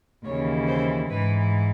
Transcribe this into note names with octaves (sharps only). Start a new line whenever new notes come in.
D#2 C#3 E3 C#5
C5
G#2 E3 B4